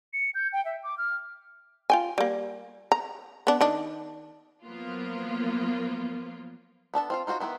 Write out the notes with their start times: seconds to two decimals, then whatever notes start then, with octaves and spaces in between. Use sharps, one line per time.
0.13 C#7
0.35 G6
0.53 G5
0.65 E5
0.83 D6
0.98 F6
1.90 F4 G5 G#5
2.18 G3 A#3
2.92 A#5
3.47 B3 D4
3.61 D#3 D4
4.66 F3 F#3 A#3 B3 F4
6.94 B3 D4 A4 A5
7.10 C4 F4 F5
7.27 D#4 F4 F#4 C5 D#5
7.40 D#3 B3 E4 B4